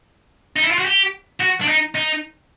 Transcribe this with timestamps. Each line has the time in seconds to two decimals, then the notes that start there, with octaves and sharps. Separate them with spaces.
0.56 D#4
0.64 E4
0.71 F4
0.79 F#4
0.85 G4
1.40 F#4
1.62 D4
1.68 D#4
1.95 D#4